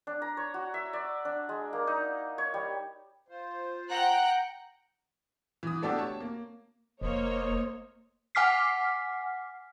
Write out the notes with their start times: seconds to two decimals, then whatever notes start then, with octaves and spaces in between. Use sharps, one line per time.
0.07 D4
0.22 A#5
0.37 C#5
0.54 F#4
0.74 E5
0.93 D5
1.25 D4
1.49 G#3
1.73 A#3
1.87 D#4
2.38 C#5
2.54 G3
3.28 F4 C5
3.91 F#5 G5 A#5 F#6
5.63 E3 D#6
5.82 A3 B3 D4 F#4 G4 A4
5.99 C#5 A5
6.20 A#3
7.02 F1 A#3 C5 C#5 D#5
8.35 F#5 G#5 D6 F6 B6 C7